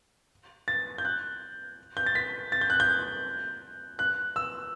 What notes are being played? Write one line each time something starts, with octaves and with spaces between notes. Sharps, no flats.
A6
G6
F#6
G6
A6
B6
A6
G6
F#6
G6
F#6
E6